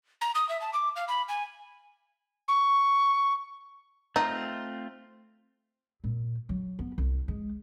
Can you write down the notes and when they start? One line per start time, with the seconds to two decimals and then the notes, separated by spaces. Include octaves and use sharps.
0.21 A#5
0.35 D#6
0.49 E5
0.61 A5
0.73 D6
0.96 F5
1.08 B5
1.29 G#5
2.48 C#6
4.16 A3 C4 D#4 F4
6.04 A#2
6.49 F#3
6.79 B3
6.98 C2
7.28 G#3